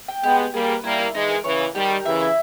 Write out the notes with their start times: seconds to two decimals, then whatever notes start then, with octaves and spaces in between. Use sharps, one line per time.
0.08 G5
0.23 G#3 B3 G4
0.39 G4
0.53 G3 A#3 G#4
0.69 B4
0.84 G3 A#3 E4
0.99 E4
1.14 E3 G#3 D#4
1.29 A#4
1.44 C#3 E3 C#5
1.60 A#3
1.74 D#3 G3 G4
1.90 A#4
2.05 C#3 E3 E5
2.20 E4